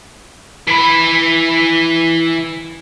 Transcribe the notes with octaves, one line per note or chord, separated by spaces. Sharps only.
E3 B5